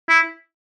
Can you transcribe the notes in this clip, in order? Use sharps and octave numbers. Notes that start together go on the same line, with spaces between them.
E4